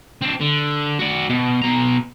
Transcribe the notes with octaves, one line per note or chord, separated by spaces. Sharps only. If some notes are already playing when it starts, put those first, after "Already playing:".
C4 D4
D3
F#4 D5
B2
B2 A#5